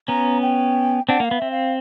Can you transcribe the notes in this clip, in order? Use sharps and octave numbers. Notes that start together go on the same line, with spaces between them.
B3 C#4 A#5
G5
C4 D4 F#5
A#3 F5
B3
C4 E5
F5